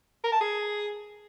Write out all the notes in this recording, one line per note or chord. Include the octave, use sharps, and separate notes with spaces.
A#4
A5
G#4